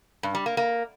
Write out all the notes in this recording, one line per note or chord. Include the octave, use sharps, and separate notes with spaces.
G2
G3
A#3
A#3